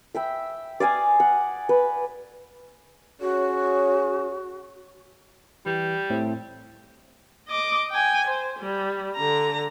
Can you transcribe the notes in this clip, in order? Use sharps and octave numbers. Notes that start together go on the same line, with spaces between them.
E5 G5 B5
D5 F5 G#5 D#6
F#5
B4
C#4 F#4 G#4 C#5
E3 G3
A2 A3 C4
D#5 D6
G5 G#5
C5
G3
D3 A#5